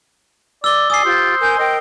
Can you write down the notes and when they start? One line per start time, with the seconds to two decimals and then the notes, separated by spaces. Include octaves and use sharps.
0.64 D5 E6 G7
0.90 D5 G#5 D#6 C7
1.05 F4 G4 C5
1.40 A#4 G#5 G6
1.59 A#4 D#5 G5